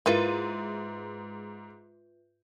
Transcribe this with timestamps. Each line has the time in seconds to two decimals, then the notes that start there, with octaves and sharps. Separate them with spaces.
0.06 G#2 A#3 E4 F4 B4 E5 F5